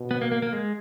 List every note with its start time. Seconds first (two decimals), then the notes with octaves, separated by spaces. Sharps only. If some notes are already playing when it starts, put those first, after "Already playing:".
Already playing: B2
0.11 B3
0.21 A#3
0.32 A#3
0.42 A#3
0.53 G#3